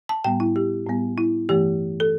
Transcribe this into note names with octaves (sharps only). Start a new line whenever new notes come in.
A5
A2 G3 B3 G5
E4
G4
A2 G3 B3
E4
G2 E3 A3 G4
A4